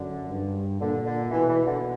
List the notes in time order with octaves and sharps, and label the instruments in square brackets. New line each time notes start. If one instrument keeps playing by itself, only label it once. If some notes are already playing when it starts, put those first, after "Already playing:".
Already playing: [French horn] F#2 [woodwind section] D3
[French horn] G2
[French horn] A#2 [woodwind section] D3
[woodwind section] D3
[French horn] B2 [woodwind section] E3
[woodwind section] E3
D3